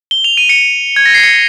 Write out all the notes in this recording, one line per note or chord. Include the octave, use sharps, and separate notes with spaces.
G7
F7
D#7
C#7
G#6
A#6
C7
C#7